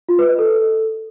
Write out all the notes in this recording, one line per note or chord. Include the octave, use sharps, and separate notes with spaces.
F4
B4
D#5
A4